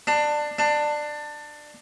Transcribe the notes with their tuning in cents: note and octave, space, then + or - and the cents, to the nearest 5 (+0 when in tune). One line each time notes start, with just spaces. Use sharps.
D4 +20
D4 +20